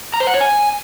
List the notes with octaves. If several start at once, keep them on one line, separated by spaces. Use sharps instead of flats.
A#5
C5
F#5
C#5
G#5